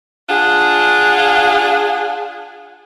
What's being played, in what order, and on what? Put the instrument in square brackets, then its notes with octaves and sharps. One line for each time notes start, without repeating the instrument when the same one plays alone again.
[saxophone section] D4 F4 G#4 F#5